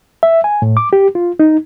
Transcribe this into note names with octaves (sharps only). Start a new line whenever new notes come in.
E5
G#5
A2
D6
G4
F4
D#4